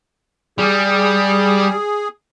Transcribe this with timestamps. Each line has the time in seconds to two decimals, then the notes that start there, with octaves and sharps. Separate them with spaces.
0.58 G3 G#4